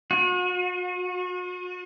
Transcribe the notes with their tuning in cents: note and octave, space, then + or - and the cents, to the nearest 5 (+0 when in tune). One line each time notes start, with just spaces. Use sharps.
F#4 -40